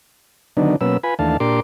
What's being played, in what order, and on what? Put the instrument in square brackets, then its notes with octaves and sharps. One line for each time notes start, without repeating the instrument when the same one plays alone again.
[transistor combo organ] D3 D#3 F#3 B3 D4 D#4
B2 F#3 A#3 C#4 B4 E6
F4 B4 G#5 B5
D#2 E3 A3 D4 F5 A5
A#2 D4 G4 A#4 C6 D6